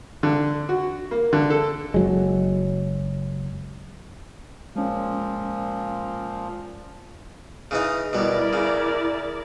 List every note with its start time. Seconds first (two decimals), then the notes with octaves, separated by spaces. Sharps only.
0.23 D3
0.69 F#4
1.11 A#3
1.33 D3
1.50 A4
1.94 F#1 F#3 G#3
4.76 A#2 F3 G#3 C#4
7.71 C#3 E3 D#4
8.13 B2 G3 E4 A#4 D5
8.53 C#3